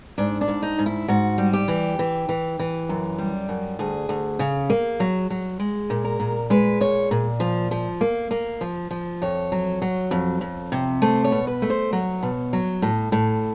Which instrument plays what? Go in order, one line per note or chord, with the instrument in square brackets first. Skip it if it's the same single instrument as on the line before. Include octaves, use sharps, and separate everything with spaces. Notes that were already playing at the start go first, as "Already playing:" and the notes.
[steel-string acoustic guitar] G#2 D4
D4
G#2
D#4
G#2
E4
G#2 F#4
G3
G4
E3
E3
E3
E3
F#2
G3
F#2
D2 G#4
D2
C#3
A#3
F#3
F#3
G#3
A#2
A#4
A#2
G#3 B4
A#2 C#5
A#2
F3
F3
A#3
A#3
F3
F3
F2 C#5
F#3
F#3
F2
F2
C3
A3 C5
C#5
B2
B4
A3
C5
F#3 C#5
B2
F#3
A2
A2